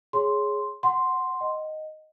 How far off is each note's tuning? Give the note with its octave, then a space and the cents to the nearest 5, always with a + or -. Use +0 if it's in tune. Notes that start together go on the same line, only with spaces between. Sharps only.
G#4 +0 C#5 +0 C6 +0
F#5 +0 C6 +0
D#5 +0 G5 -45